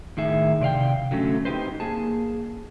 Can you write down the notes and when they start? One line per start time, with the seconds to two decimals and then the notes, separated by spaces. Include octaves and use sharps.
0.17 A2 D#3 D#4 G#4 E5
0.61 C3 D5 F5 G5
1.11 D3 F#3 A3 C#4
1.45 C4 D#4 G4 B4 C5
1.80 A#3 G#4 A5